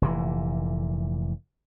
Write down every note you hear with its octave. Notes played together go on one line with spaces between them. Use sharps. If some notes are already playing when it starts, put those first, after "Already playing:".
F1 A#2 E3